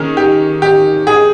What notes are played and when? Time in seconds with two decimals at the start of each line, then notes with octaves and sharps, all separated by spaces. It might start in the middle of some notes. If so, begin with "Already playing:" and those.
Already playing: D#3 A#3 C#4 G#4
0.17 G4
0.62 G4
1.07 G#4